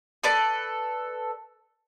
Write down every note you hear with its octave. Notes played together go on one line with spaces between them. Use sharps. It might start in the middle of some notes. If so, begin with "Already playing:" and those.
A4 B4 D5